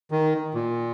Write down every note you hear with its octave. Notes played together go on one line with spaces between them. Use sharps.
D#3
A#2